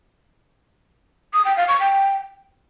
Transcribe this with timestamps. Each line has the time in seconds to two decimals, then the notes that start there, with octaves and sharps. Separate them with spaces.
1.33 D#6
1.45 G5
1.57 F5
1.68 C#6
1.80 G5